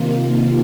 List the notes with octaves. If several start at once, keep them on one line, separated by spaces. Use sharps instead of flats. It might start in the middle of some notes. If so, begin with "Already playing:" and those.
Already playing: C3 D#3 A#3 F4